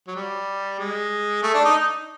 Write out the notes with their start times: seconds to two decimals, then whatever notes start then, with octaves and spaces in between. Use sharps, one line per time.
0.07 F#3
0.16 G3
0.79 G#3
1.43 A3
1.54 D4
1.64 D#4